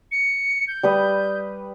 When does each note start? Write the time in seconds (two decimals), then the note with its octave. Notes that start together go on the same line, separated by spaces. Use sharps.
0.12 C#7
0.68 G6
0.83 G3 B4 D#6